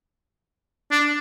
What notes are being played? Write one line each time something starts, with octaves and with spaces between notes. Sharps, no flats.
D4